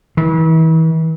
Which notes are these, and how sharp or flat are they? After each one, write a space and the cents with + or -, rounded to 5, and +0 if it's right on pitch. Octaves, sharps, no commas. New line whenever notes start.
E3 -40